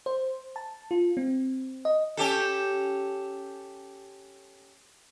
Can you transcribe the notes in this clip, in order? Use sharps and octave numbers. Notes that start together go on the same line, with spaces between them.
C5
A5
F4
C4
D#5
C#4 G4 A4